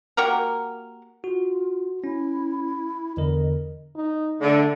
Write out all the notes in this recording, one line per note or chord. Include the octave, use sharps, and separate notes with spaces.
A#3 F#4 G4 A#4
F4 F#4
C#4 E4
E2 D3 A#4 D#5
D#4
D3 A3